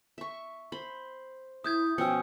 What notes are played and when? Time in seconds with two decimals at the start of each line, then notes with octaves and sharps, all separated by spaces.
0.18 E5 C#6
0.72 C5 B5
1.64 E4 E5 D#6 G6 G#6
1.98 B2 F3 C#4 G5 E6 G6 C#7